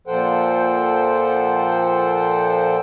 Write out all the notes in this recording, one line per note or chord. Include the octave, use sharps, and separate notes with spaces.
A#2 F3 A4 C5 F#5 G5